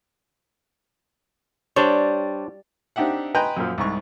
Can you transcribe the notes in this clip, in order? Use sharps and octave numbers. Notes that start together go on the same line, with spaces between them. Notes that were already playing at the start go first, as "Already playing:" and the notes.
G3 D4 C5 C#5
C4 D4 D#4 G4 E5 F#5
B4 D#5 G5 G#5 A#5 C6
F#2 A#2 F3
C2 G#2 C#6